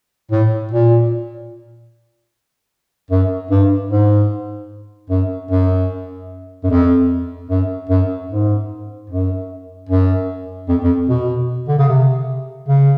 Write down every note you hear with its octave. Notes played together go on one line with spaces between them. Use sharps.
A2
A#2
F#2
G2
G#2
F#2
F#2
F#2
F2
F#2
F#2
G#2
F#2
F#2
F2
F2
B2
D3
C#3
C3
C#3